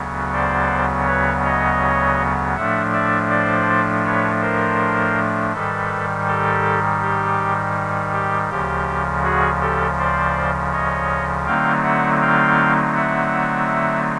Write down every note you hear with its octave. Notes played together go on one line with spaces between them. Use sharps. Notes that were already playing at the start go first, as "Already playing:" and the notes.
Already playing: D2 C#3 F#3 B3
C5 D5
B4 C#5
C#5 D#5
A2 F3 A3 D4 E5 F#5
D5 E5
C5 D5
B4 C#5
A#4 C5
G#2 D#3 G3 A4 B4
G4 A4
G4
G4
D2 C#3 F3 G4
F#4 G#4
G4 A4
C5 D5
C#5 D#5
D3 F#3 A3 C4 D#4 F5 G5
E5 F#5
F5 G5
E5 F#5